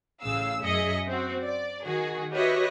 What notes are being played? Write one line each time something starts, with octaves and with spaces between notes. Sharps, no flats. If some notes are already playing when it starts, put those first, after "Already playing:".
A1 C#3 F5 E6
F#2 G#4 D#5 E5 C#7
C4 F#4
D5
D#3 F#4 G#4
F#4 G4 B4 C#5 D#5 E5